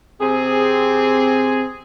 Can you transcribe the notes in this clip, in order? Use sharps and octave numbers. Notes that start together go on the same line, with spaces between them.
C3 C4 G#4